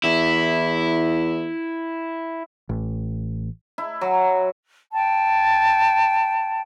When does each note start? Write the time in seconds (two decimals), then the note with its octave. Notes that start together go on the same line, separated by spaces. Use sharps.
0.04 E2 E4
2.69 A1
3.78 E4
4.01 F#3
4.93 G5 A5